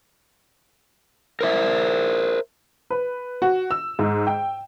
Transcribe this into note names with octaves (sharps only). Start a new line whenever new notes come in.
A#4 C5 E5
B4
F#4
E6
G#2
G5